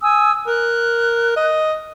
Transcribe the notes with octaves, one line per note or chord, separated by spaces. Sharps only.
G#5 D#6 E6
A#4 F#6
D#5